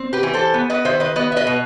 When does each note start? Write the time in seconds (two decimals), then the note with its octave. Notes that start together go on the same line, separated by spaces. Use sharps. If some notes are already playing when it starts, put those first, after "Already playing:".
Already playing: C4
0.13 G4 B4
0.23 E3
0.33 A4 C5
0.54 B3
0.70 B4 D#5
0.85 D#3 C5 E5
1.00 B4 D#5
1.16 B3 B4 D#5
1.32 E5
1.37 B4 D#5
1.47 B2